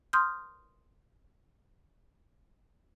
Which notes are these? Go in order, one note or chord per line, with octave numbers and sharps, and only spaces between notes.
C6 D#6 F6 G6